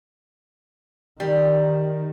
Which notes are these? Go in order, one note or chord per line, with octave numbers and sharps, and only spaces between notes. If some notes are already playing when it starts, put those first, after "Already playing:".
D#3 G3